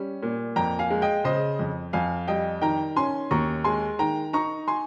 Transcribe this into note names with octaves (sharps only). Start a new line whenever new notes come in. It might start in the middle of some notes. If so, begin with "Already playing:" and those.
Already playing: G3 C#4
A#2
F2 G5 A#5
F5 G#5
G#3
D#5 G5
C#3 C5 D#5
F2
F2 F5 G#5
G3 D#5 G5
D#3 G5 A#5
C#4 G#5 C6
D#2 A#5 C#6
G#3 G#5 C6
D#3 G5 A#5
D#4 A#5 C#6
G#5 C6